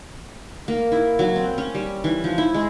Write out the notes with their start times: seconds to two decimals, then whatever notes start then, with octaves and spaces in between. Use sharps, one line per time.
0.68 A#3
0.92 E4
1.19 F#3
1.36 C4
1.58 C#4
1.74 G3
2.04 E3
2.24 F3
2.38 E4
2.54 G#3